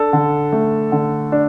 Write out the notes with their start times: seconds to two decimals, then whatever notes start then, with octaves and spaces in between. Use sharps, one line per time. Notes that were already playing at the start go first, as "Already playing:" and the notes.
Already playing: D4 A4
0.13 D3
0.53 A3
0.92 D3
1.32 D4